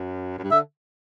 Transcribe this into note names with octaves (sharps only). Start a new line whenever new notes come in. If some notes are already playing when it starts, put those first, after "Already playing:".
Already playing: F#2
F#2
G2
D3 E5